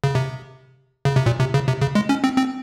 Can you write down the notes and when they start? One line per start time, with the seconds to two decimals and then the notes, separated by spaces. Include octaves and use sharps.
0.04 C#3
0.15 C3
1.05 C#3
1.16 C3
1.26 A#2
1.40 C3
1.54 C#3
1.68 C3
1.82 C#3
1.95 G#3
2.09 C#4
2.24 C4
2.37 C4